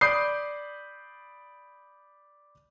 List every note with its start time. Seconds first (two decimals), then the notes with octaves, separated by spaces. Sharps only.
0.01 D5 B5 D#6 G6 C7